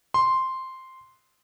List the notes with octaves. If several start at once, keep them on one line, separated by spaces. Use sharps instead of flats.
C6